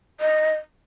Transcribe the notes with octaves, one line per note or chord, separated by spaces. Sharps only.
D#5